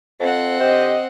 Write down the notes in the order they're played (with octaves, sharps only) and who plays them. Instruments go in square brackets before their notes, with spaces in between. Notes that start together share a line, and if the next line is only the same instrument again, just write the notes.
[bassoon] F2 [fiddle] C4 F#5
[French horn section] D3 G4 D#5 [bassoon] C5